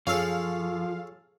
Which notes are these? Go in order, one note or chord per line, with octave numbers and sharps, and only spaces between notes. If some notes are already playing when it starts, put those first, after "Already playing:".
F#2 F3 G#4 A4 C#5 F5